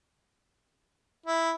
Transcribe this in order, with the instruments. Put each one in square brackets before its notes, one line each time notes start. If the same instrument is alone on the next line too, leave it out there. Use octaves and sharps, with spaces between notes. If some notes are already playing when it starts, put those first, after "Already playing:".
[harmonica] E4